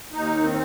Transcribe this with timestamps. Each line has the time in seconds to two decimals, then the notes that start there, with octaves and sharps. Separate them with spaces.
0.13 D#2 D#4
0.36 D#3
0.43 C4